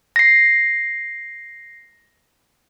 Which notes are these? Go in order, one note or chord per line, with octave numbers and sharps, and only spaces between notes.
A#6 C7